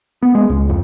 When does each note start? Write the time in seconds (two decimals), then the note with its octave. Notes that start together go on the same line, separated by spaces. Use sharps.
0.22 B3
0.35 G#3
0.50 C#2
0.69 F2